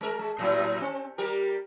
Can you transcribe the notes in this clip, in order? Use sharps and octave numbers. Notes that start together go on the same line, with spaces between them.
G#3 A#4
G#3
A2 F#3 E4
C4
G3 G4 A#4